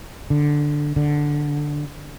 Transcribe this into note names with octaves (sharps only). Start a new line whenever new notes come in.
D3
D3